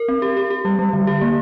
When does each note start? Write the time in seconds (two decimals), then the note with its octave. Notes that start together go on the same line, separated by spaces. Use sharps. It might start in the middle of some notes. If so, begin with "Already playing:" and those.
Already playing: A#4
0.08 C4
0.22 G4
0.37 G4
0.50 G4
0.65 G3
0.79 G3
0.93 D3
1.07 G4
1.21 A#3